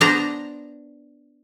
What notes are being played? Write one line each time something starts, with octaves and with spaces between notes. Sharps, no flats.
B3 D4 C5 A#5